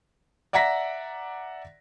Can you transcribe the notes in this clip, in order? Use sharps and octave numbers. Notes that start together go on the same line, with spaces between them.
D5 E5 F#5 A#5 A#6 B6